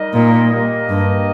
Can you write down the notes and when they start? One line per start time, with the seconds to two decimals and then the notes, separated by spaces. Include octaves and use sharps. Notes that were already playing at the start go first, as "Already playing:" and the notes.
Already playing: G3 D#4 A#4 D#5
0.13 A#2
0.51 A#3 G4 A#4 D#5
0.89 G2